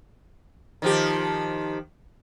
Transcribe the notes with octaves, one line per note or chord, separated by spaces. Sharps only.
D#3 F3 G4